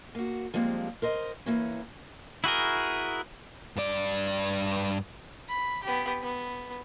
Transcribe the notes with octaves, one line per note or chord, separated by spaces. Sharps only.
A#3 F#4
F3 G3 G#3 A#3 C4
A#4 C5 D#5
E3 A#3 C#4
E4 F#4 G#4 A#4
G2 D5
B5
B3 G4
B3